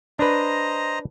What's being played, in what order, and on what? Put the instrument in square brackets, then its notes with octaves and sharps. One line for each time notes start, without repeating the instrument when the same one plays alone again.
[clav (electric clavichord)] D4 B4 [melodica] C5 D#5 A#5